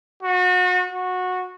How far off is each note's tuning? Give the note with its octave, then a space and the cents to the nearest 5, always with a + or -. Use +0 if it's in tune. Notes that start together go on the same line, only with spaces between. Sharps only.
F#4 -30
F#4 -15